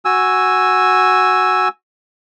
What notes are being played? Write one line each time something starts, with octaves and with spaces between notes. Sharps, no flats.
F#4 G#5 E6